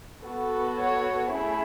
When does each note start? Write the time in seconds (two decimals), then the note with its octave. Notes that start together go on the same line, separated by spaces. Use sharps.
0.24 B3 F#4 A4
0.79 C#5
1.33 A3 C#4 E4 G#4